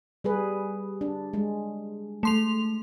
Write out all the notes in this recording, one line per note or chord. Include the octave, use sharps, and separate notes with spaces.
G3 G#4 B4
D4
G#3
A3 C6 F7